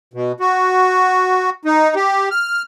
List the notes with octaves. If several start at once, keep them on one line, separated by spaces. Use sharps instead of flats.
B2
F#4
D#4
G4
F6